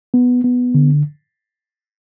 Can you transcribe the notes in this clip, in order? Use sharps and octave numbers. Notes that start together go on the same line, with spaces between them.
B3
B3
D3